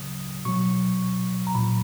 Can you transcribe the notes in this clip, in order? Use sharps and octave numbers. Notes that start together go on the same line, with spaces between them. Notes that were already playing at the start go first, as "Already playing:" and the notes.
Already playing: C#3 F#3 D#6
B2 F#3 C#6
A#5
A#2 F#3 B5